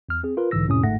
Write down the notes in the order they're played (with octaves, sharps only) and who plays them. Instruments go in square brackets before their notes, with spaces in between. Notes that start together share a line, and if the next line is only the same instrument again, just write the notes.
[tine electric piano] E2 F6
C4 G#4
F4 A#4 B4
B1 G#2 D3 E3 E6 A#6
F2 A2 C3 C#4 D#6
G1 G#2 A3 F#5 A#6